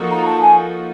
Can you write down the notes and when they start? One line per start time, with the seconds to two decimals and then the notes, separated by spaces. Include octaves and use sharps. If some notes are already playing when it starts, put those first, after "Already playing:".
Already playing: F3 A#3 D#4 F#4 A4
0.11 A#5
0.26 A5
0.42 G#5